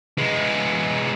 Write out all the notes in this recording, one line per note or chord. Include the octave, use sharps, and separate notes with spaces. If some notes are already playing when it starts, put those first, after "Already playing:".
G#3 B3